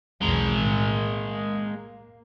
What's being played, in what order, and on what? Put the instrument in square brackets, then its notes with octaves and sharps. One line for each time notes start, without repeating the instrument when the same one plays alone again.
[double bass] B1 E2 [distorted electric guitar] G#3 A#4
[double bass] A2 D#3
A#3